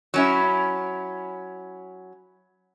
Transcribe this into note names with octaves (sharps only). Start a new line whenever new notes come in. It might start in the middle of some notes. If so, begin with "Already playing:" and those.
F#3 C#4 E4